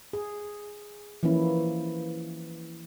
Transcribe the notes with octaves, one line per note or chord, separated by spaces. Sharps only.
G#4
E3 F3 A#3 C#4 E4